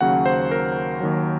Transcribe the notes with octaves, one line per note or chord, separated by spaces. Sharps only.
D#2 C#3 F#3 F#5
C5
A#4
D#2 D#3 F#3